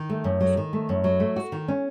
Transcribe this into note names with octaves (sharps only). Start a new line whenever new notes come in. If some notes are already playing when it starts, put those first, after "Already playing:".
Already playing: D#3
A3
F#2
F#3
D#3
A3
F#2
F#3
A3
F#4
D#3
C#4